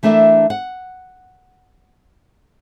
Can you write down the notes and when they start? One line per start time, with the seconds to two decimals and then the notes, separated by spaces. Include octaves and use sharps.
0.03 E3 A3 D4 A#4 E5
0.50 F#5